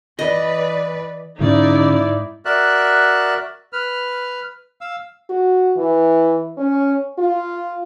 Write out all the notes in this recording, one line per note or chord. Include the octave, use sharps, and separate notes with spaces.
E3 B4 D5 D#5
G#2 D3 C#4 D#4 E4 D5
F#4 A#4 D5 E5 F#6
B4 F6
F5 E6
F#4
E3
C#4
F4